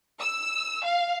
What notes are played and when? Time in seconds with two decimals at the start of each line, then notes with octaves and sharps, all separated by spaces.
0.20 E6
0.84 F5